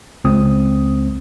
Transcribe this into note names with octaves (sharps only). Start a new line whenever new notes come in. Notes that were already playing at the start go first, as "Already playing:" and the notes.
C#2 C4 D#6